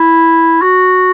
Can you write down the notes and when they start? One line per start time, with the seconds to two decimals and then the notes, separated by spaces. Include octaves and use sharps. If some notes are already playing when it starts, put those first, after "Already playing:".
Already playing: E4
0.62 F#4